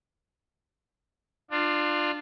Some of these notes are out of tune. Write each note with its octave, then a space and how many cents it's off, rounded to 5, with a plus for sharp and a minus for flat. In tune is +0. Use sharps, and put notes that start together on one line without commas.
D4 +25 F4 +0